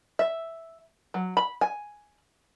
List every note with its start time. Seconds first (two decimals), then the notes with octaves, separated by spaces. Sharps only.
0.19 E5
1.14 F#3
1.37 B5
1.61 G#5